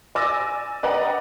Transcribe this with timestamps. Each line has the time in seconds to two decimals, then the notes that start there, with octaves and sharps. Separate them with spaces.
0.15 D5 G#5 D6 E6 A6 A#6
0.83 B4 D5 D#5 F#5 G5 A#5